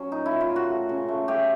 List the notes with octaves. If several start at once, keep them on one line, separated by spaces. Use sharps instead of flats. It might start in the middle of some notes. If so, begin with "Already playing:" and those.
Already playing: F#3 C#4
A#2 D#4
E4
A#2
F4
A#2
F#4
A3
C#3
A3
A3 G4